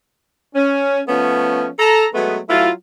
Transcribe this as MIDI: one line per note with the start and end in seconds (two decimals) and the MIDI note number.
0.55 0.99 61
1.07 1.67 53
1.07 1.67 57
1.07 1.67 59
1.07 1.67 61
1.79 2.05 69
1.79 2.05 82
2.14 2.37 54
2.14 2.37 56
2.14 2.37 57
2.14 2.37 59
2.49 2.69 54
2.49 2.69 57
2.49 2.69 64
2.49 2.69 65